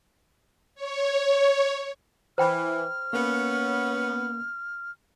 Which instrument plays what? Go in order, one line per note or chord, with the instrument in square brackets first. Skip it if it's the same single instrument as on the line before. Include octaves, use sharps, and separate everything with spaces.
[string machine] C#5
[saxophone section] E3 [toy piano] C5 G5 B5 [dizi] F6
[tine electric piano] A#3 [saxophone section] B3 C#4